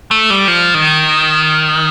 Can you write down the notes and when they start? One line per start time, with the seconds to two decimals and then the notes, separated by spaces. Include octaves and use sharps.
0.11 A3
0.30 G3
0.48 F3
0.75 D#3